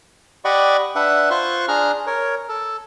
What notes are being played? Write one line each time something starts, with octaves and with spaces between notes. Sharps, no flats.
G4 D5 D#5 F#5 B5 C#6
D4 B4 E5 F#5
F4 C5 C6 C#6 F#6
D4 G#4 A#5 F6 F#6
A#4 C#5
A4